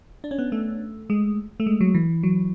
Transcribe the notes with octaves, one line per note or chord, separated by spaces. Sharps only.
D4
C#4
B3
A3
G#3
A3
G#3
F#3
E3
F#3